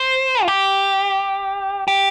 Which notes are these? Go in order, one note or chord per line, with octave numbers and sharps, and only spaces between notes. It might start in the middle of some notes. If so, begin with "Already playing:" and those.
Already playing: C5
F4
G4
G4